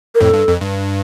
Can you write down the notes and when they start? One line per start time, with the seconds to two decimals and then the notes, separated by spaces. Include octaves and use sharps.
0.15 A#4
0.21 F2 A2 A4
0.34 G2
0.47 F2
0.60 G2